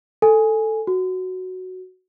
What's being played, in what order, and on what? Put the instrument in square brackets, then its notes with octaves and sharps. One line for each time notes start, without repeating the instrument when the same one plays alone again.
[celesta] A4 G#5
F#4